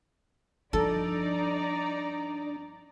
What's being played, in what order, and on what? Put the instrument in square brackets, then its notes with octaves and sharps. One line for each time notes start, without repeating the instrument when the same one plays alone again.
[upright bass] G2 F3 [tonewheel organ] D4 [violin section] D#4 D5 A#5 [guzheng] A4